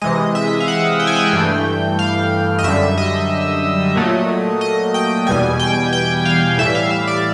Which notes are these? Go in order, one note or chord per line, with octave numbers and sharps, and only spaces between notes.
C3 E3 G#3 D#5
E5
F5
F#5
G5
G#5
G5
G2 E3 A3
F5
D#5
F#2 D3 G3 E5
D#5
A#2 F#3 A3
D#5
G5
E2 B2 G3 G#5
G5
G5
F5
A2 E3 G3 E5
F5
E5
D5